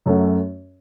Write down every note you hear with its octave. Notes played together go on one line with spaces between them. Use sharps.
F#2 F#3 A3 C#4 F#4